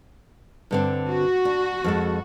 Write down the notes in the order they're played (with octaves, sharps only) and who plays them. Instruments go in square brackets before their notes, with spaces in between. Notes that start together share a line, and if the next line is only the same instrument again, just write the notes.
[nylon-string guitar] G2 D3 C4
[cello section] F#4
[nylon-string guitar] D4
F2 G#3 A4